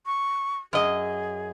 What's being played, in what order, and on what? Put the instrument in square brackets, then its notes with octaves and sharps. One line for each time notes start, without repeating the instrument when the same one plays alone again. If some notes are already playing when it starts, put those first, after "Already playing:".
[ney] C#6
[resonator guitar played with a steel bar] F#2 D#5 [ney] G#4